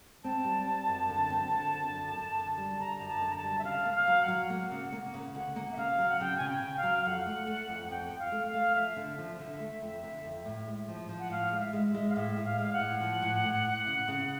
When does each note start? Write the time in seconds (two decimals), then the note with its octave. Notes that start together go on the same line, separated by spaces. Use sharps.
0.24 C4 A5
0.44 G3
0.67 C4
0.88 F#2
1.09 D3
1.30 C4
1.51 D3
1.73 F#2
1.94 F#2
2.16 F#2
2.36 D3
2.58 G3
2.79 D3 A#5
3.00 F#2
3.08 A5
3.22 D3
3.30 A#5
3.36 A5
3.44 G3
3.58 E5
3.64 C#3 F5
3.85 A#3
3.93 F5
4.07 F#3
4.22 F#5
4.28 F#3
4.50 A#3
4.71 C#3
4.92 A#3
5.14 C#3
5.34 D2 F#5
5.56 A#3
5.71 E5
5.77 C#3 F5
5.98 F#3
6.09 F#5
6.20 C#3 G5
6.36 C#3 G#5
6.48 G5
6.62 C#3
6.77 F5
6.83 F#3
6.98 F5
7.05 F2 F#5
7.26 A3
7.47 A3
7.69 F2
7.90 F2 G5
8.11 F2
8.19 F5
8.32 A3
8.46 F5
8.54 A3
8.75 F3 E5
8.96 D3
9.18 F3
9.39 D3
9.60 A3
9.82 F2
10.04 D3
10.25 F2
10.45 A2
10.67 G#3
10.88 F3
11.09 F3
11.19 F#5
11.30 A2 F5
11.52 G#3 F5
11.59 E5
11.73 G#3
11.87 E5
11.95 G#3
12.09 F5
12.15 A2 E5
12.37 A2
12.44 F5
12.58 G#3 F5
12.73 F#5
12.80 A2
13.00 F3
13.22 A2
13.44 A2
13.65 A2
13.87 C#3
14.08 C#3